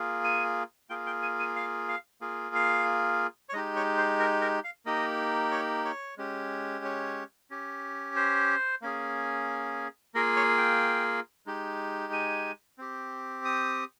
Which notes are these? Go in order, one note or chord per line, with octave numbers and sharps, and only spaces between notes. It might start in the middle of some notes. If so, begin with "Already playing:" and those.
Already playing: A#3 F4 G#4
G#5
A#3 F4 G#4 G5
G5
G#5
G#5
F5
F5
A#3 F4 G#4
F5
C#5
G#3 D#4 G4 D#5
C#5
C5
A#4
A#4
F5
A#3 D#4 G4 D#5
C#5
C#5
G#3 C#4 G4
C#5
C#4 G4
C5
A#3 C#4 G#4
A#3 F4 G#4 A#4
C#5
G5
G#3 D#4 G4
G#5
C4 G4
D#6